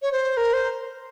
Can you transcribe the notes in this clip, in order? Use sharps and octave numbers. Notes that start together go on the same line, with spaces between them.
C#5
C5
A#4
C5